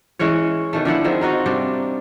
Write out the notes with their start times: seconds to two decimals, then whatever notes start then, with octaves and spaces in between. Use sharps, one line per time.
0.19 E3 G#3 C#4 C#5
0.73 B2 D#3 A3
0.85 D3 F3 E4 F#5
1.04 D#3 F3 C4 G#4
1.21 D#4 F4 F#4 D#5
1.46 C3 G3 D4